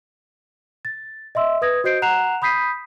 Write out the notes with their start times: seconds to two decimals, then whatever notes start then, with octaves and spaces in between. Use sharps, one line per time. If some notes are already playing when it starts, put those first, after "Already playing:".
0.85 A6
1.35 D#5 E5 C6 E6
1.62 B4 D#6 G#6 A#6
1.84 F#4 C5 D#5 G6 C7 D7
2.02 F#5 A#5 F#6 C7 E7 F7
2.42 B5 D#6 G6 B6 C7 D#7